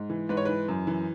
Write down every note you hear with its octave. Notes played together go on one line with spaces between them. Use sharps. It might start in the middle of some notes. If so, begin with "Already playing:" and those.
Already playing: G#2
E3
G#2 B4
C#5
E3 B4
F#2
E3